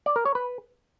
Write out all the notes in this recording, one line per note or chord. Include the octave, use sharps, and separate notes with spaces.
D5
A#4
C#5
B4